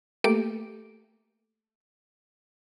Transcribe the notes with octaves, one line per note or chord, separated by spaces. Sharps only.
A3 A#3 G4 A4 D6 D7